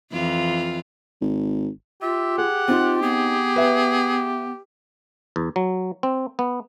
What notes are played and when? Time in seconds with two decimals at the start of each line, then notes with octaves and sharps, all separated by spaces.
0.12 F2 E3 F4
1.21 G#1
2.02 F4 G4 E5
2.38 G#4 F#5
2.68 C4 D#4 F4
3.02 B3 G#4
3.56 B4 E5
5.36 E2
5.56 F#3
6.03 C4
6.39 B3